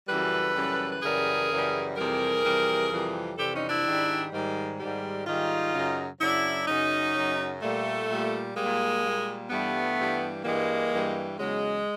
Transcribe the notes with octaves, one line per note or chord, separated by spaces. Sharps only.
F#2 C#3 E3 G3 A4 B4
F#2 C#3 E3 G3
B4
F#2 C#3 E3 G3 G#4 A#4
F#2 C#3 E3 G3
F2 C3 E3 G3 G#4 A#4
F2 C3 E3 G3
F2 C3 E3 G3
F2 C3 E3 G3 G4 A4
C#4 D#4
D4 E4
G#2 D#3 G3
G#2 D#3 G3
G#2 D#3 G3
G#2 D#3 G3 D#4 F4
F#2 C#3 F#3
F#2 C#3 F#3 D4 E4
F#2 C#3 F#3 C#4 D#4
F#2 C#3 F#3
A#2 G3 A3
A#2 G3
A#2 G3 G#3 A#3
A#2 G3
G2 E3 G3 A3 B3
G2 E3 G3
G2 E3 G3 G#3 A#3
G2 E3 G3
E2 C#3 F#3 G#3